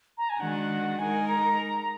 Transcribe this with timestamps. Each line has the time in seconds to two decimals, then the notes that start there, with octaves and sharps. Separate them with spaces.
0.18 A#5
0.30 G#5
0.40 D#3 G#3 D4 F#4 F#5
0.99 G#3 D#4 A#4 G#5
1.28 A#5